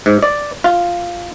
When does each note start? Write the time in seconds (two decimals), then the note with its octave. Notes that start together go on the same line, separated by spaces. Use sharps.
0.06 G#2
0.23 D5
0.64 F4